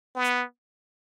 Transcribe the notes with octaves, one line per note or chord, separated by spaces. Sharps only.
B3